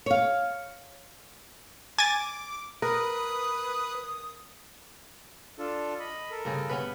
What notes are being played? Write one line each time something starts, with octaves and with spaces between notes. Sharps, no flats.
C#5 F5
G#5 D6 A6
A#4 B4 D#6
D4 F4 A4
D#5 B5
A4 A#4
G2 C#3 G#4
B3 C#4 B4